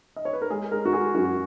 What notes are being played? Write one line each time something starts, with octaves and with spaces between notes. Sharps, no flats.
D#5
C#5
B4
A#4
G#3 G#4
G#3 A#4
F#4
G#3 G#4
F#2 F#4